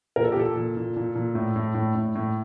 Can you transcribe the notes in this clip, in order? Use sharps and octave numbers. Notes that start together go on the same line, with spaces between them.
A#2 A#4
A4
G4
A#2 A4
A#2
A#2
A#2
A#2
A2
A2
A2
A2
A2